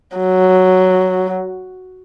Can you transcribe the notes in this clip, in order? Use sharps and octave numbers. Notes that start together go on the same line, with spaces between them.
F#3